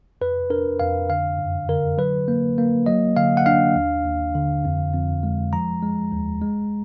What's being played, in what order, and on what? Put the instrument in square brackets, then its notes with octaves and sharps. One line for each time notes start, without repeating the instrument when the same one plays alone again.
[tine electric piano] F2 B4
D4 A#4
F2 F5
D3 F5
F#2
D3 A#4
F#3 B4
A#3
A#3
F#3 D#5
D3 F5
F#5
D4 F5
D#2
D#2
D3
F2
F2
G#3
F3 A#5
G#3
D#2
G#3